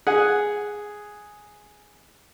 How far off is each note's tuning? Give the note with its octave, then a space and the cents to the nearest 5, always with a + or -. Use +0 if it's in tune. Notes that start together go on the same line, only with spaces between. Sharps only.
G#4 +0 F#5 +0